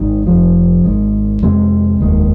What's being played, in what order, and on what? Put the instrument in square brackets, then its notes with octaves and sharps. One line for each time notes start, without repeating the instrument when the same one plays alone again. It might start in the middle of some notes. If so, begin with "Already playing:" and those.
Already playing: [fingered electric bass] G#1 G#2 D#3
F1 F2 F3
G#1 G#2 G#3
F2 C3 G#3 C4
F1 D#2 D#3 G#3